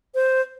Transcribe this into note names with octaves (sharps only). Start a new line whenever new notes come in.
C5